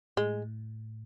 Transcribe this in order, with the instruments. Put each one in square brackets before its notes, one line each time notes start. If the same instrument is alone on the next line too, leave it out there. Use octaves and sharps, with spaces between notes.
[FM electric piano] A2 [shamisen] G#3